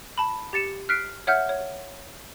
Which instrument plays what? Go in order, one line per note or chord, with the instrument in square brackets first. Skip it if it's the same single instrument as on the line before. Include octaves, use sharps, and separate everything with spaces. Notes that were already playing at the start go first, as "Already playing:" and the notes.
[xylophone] A5 B5
G4 A6 C#7 E7
F6 F#6 B6 C7 D7
C#5 E5 F#5 F6 G6
C#5